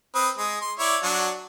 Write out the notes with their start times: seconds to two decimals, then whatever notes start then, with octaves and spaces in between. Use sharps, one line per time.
0.15 C4 B4 D#6
0.38 G#3 D#6
0.61 C6
0.79 E4 C#5 D5
1.03 F#3 D4 F#4